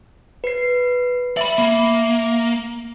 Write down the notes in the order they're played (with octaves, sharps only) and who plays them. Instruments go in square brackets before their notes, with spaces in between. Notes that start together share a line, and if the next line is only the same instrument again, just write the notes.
[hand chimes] B4 C7
[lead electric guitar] D5 B5 [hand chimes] E5
[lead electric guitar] A#3